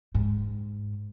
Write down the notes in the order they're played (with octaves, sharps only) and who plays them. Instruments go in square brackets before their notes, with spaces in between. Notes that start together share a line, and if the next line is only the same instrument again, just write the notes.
[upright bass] G#2